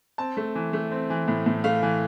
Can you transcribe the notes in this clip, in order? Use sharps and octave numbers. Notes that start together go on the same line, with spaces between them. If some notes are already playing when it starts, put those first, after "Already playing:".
C4 A5
A3
E3
A3
C4
E3
A2
A2
A3 F5
E3